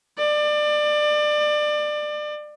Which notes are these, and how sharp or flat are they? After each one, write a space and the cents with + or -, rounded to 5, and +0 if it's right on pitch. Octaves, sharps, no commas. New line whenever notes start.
D5 +25